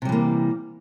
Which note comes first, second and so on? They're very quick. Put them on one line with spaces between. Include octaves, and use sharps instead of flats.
C3 G3 E3 A#3